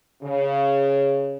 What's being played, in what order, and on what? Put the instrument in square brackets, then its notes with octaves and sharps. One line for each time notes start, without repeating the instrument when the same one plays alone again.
[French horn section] C#3